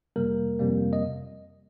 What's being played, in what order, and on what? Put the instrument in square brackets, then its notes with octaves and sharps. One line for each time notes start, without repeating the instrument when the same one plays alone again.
[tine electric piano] F2 C3 G3 A#3 A#4
F2 C3 G3 A#3
D#5